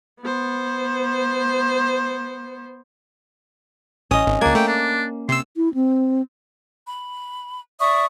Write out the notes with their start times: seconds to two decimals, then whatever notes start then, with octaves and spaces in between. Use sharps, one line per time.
0.21 B3 C5
4.11 A1 C#4 D#5 D#6
4.27 G#1
4.41 C#2 A#3 D4 G#6
4.55 A3 G5
4.67 D4
5.29 C3 C6 E6
5.57 E4
5.74 C4
6.85 B5
7.80 D5 E5 C#6 D#6